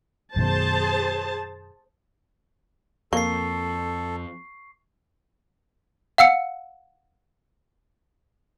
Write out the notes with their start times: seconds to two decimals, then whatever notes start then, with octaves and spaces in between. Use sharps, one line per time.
0.36 F#2 B2 D#3 G#4 C5 A5
3.13 F2 A#3 A4 C#6 C7
6.18 F5 F#5 E6 C#7